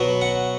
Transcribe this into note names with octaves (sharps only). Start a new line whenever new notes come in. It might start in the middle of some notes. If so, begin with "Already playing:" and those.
Already playing: B2 F#3 B3
F#5